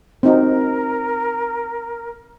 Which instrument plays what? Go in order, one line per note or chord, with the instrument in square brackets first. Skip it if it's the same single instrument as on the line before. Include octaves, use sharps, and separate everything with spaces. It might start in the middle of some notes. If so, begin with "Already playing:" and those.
[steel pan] C4 D#4 F#4 [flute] A#4